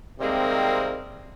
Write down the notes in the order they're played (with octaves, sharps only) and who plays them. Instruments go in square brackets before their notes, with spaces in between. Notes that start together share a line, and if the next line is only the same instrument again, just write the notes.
[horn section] C3 D#3 G3 G#3 A#3 C4